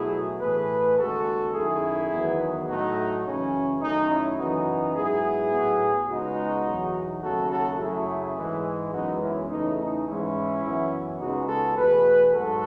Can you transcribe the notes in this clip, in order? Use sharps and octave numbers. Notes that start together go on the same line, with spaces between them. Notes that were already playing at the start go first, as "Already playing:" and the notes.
Already playing: B2 F#3 A3 E4 G#4
A2 E3 A3 G#4 B4
D#2 C#3 G#3 F#4 A4
F#2 D#3 A3 E4 G#4
E2 D#3 F#3 B3
A2 F#3 A3 D#4 F#4
F#2 C#3 E3 C#4
F#2 D#3 A3 D#4
C#4 E4
F#2 C#3 E3 B3 D#4 F#4
G#2 F#3 B3 E4 G#4
A2 F#3 B3
C#2 C#3 G#3 B3 D#4 F#4
E2 B2 F#3
D#2 C#3 F#3 A3 F#4 A4
F#4 A4
F#2 C#3 F#3 A3 E4 G#4
G#2 E3 G#3
F#2 E3 G#3 B3 D#4 F#4
C#4 E4
E2 C#3 E3 A3 D#4
D#4
G#2 E3 G#3 C#4 E4
F#2 E3 B3
C#2 C#3 G#3 B3 D#4 F#4
F#4 A4
E2 B2 A3 G#4 B4
G#2 F#3 F#4 A4